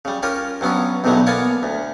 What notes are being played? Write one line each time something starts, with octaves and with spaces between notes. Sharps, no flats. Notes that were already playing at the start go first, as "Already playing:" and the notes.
C#3 G3
C#4 F4 G4 A#4
G2 F#3 B3 C#4
B1 E2 B2 D3 F#3 G3
A#3 B3 C#5 D5 F5 G#5
D2